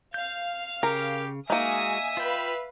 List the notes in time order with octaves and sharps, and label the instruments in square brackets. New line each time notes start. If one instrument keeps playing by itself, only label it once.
[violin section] F5 [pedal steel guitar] G6
[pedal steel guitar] C#3 [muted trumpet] G4 [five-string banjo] A#4
[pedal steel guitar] G#3 F#4 [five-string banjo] A#3 D#4 [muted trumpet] E5 [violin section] G#5 D#6
[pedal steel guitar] F4 G5 [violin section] B4 F5